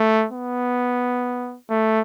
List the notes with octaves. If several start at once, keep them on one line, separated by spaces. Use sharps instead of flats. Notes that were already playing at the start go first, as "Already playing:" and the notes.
Already playing: A3
B3
A3